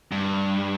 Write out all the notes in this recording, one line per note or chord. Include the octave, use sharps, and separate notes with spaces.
G2